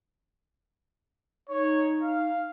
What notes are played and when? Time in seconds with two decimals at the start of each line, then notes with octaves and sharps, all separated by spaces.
1.49 D#4 C#5
2.03 F5